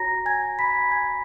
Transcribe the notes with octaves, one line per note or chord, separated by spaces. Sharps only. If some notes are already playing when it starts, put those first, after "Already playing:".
Already playing: F#4 C#5 A#5 A#6
G#5 G#6
B5 B6
G#5 G#6